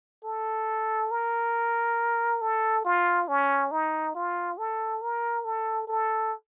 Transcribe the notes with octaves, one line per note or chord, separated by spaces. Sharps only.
A4
A#4
A4
F4
C#4
D#4
F4
A4
A#4
A4
A4